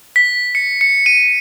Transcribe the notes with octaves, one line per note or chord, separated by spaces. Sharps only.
B6
C#7
C#7
D#7